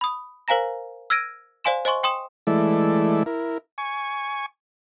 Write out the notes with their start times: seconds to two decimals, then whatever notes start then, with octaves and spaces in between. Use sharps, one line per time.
0.01 B5 D#6
0.48 A#4 C5 F5 G#5 A#5 A#6
1.10 E6 F6 G#6 A#6 D7 D#7
1.64 C5 D5 F5 G#5 C6 E7
1.85 C5 D#5 G#5 C6 C#6
2.03 G5 C6 D#6 E7
2.47 E3 G#3 A3 E4 A4 D5
3.26 E4 A#4
3.78 G#5 C#6